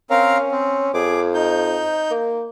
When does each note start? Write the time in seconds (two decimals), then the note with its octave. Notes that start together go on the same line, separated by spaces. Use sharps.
0.10 C4 C#4 A#4 F5
0.52 C4
0.94 F2 G#4 D6
1.34 D#4 G6
2.11 A#3